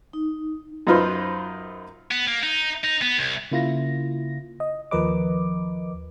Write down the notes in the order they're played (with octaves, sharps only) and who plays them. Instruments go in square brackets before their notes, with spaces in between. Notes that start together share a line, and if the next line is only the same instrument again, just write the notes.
[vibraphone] D#4
[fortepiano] F#2 D#4 F4 B4 C5
[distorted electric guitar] B3
A#3
D#4
D#4
B3
C2
[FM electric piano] C#3 A#3 E4 F4 A#6
D#5
D#2 F3 A#4 B4 D#5 D6